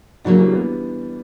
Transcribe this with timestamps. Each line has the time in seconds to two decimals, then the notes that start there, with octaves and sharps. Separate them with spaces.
0.24 E2 C#3 F#3 A#3 D4 F#4
0.39 E3 G3
0.53 G3 B3